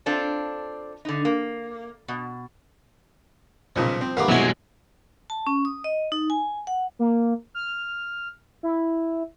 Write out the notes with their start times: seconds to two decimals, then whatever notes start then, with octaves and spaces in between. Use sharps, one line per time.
0.06 C4 D4 F4 A4
1.05 D3 D#4
1.25 A#3
2.08 B2
3.76 B1 A#2 C#3 F3
4.01 C4
4.17 G2 E3 A3 A#3 F5 F#5 D6
4.29 C2 B2 F#3 G#3 E4 F#4 E5 G#5
5.30 A5
5.47 C#4
5.65 D#6
5.84 D#5
6.12 D#4
6.30 G#5
6.67 F#5
6.99 A#3
7.55 F6
8.63 E4